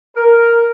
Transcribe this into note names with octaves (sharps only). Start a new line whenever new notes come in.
A#4